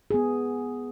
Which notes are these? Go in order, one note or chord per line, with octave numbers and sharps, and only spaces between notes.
B3 G#4